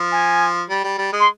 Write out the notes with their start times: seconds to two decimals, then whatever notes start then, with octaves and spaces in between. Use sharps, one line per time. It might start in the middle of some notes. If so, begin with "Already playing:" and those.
Already playing: F3
0.12 G#5
0.69 G3
0.84 G3
0.98 G3
1.13 G#3
1.20 C6